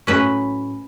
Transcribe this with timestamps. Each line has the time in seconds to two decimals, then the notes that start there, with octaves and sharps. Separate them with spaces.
0.07 A2 F#3 C#4 B4